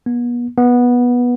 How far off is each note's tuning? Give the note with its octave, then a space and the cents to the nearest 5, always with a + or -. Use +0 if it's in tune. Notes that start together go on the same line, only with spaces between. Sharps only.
B3 -40
B3 -15